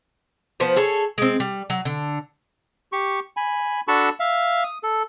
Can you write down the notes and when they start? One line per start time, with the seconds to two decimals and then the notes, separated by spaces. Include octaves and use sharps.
0.60 F3 B3 B4 C5
0.76 G#4 A4 C#5
1.18 G#3 C4
1.40 G3
1.70 F#3
1.85 D3
2.92 G4 C#6
3.37 G#5 B5
3.88 D4 F#4 A4 A5 B5 C#6
4.20 E5 F5
4.64 D#6
4.83 A4